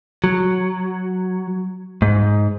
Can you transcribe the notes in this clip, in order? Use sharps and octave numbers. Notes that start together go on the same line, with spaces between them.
F#3
G#2